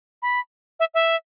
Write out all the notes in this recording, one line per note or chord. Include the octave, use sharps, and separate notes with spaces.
B5
E5
E5